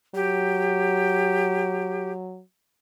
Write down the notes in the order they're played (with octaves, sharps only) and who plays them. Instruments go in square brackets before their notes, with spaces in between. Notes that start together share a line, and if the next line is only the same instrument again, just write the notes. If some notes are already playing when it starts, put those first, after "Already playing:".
[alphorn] F#3 [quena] G4